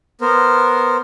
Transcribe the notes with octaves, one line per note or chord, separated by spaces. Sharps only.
B3 A#4 C5